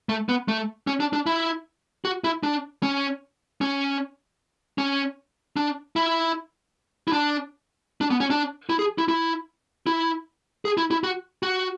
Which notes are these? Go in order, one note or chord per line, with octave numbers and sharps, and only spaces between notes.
A3
B3
A3
C#4
D4
D4
E4
F#4
E4
D4
C#4
C#4
C#4
D4
E4
E4
D4
D4
B3
C#4
D4
E4
G#4
E4
E4
E4
G#4
E4
E4
F#4
F#4